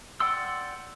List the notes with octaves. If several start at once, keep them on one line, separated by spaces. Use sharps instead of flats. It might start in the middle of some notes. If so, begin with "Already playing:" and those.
D5 F#5 G5 C6 E6